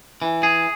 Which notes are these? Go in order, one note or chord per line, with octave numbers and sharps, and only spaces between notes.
E3
G#4